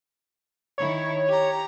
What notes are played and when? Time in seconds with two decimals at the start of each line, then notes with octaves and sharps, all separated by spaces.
0.78 D#3 E4 C#5
1.28 G4 A#5